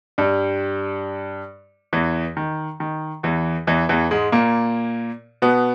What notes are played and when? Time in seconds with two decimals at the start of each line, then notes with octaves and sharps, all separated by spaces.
0.18 G2 G3
1.93 E2 E3
2.37 D#3
2.80 D#3
3.23 E2 E3
3.67 E2 E3
3.89 E2 E3
4.11 G#2 G#3
4.32 A#2 A#3
5.42 B2 B3